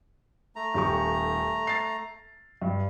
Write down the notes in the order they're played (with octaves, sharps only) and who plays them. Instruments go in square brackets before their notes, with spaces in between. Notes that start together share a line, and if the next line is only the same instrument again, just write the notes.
[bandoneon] A3 A#5
[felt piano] D#1 G4 C#6
A6 C7
G2